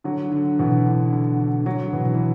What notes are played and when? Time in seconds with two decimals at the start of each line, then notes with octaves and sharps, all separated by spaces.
0.04 D3 F#3
0.32 D3
0.59 B2 E3
0.86 D3
1.13 D3
1.40 D3
1.66 D3 F#3
1.93 B2 E3
2.14 E3